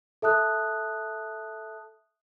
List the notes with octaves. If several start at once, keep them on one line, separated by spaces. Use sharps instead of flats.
A4 E5 A5 D#6 F#6